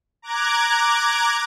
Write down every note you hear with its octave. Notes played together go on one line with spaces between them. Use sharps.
A#5 D6 F#6 G#6